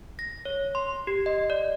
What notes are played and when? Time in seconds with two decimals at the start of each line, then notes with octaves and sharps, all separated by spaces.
0.19 A#6
0.45 C#5
0.75 C6
1.07 G4
1.26 D#5
1.50 D5